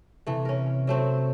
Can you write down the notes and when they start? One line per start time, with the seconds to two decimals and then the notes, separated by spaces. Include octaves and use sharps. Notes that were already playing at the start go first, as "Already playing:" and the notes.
0.27 C3 E3 A3
0.45 C#4 A#4
0.87 F#3 A3 C4